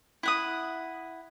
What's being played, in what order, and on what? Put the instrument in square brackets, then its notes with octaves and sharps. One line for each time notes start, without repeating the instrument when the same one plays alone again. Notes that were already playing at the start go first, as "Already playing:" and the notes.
[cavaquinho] E4 F#5 D#6